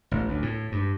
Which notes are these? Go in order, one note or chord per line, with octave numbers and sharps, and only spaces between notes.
A1
D2
A2
G2